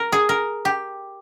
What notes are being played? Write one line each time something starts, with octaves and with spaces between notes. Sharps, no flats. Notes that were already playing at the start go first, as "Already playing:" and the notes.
Already playing: A#4
G#4
A#4
G4